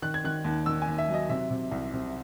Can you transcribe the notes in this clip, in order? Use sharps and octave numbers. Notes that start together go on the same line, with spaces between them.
D#3 F#6
G#6
D#3 F#6
D#2
D#3 E6
G#5
D#2
E5
F#3
D#5
C3 E5
C3
C2
C3